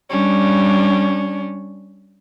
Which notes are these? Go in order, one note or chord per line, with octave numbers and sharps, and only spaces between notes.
G3 C#4 D4